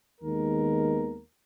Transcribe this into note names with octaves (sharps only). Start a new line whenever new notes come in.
D#2 D#3 G#3 B3 A#4